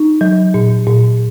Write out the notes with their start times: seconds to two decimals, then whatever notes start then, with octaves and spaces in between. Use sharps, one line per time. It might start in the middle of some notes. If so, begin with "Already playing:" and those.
Already playing: D#4
0.21 F#3
0.54 A#2
0.87 A#2